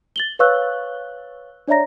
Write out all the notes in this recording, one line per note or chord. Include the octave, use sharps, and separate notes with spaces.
A6 F#7 G7
B4 C#5 F5 C#6 E6 F#6
D4 C#5 D5 E5 A#5 A#6